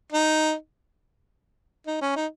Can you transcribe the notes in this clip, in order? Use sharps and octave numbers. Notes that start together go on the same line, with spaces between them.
D#4
D#4
C#4
D#4